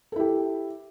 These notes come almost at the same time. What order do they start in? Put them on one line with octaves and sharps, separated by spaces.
A4 E4 G4